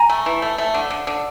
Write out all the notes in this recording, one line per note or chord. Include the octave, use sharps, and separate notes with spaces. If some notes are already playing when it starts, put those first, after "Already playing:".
Already playing: G#5 A#5
A3
E3
A3
A3
D3
D3
D3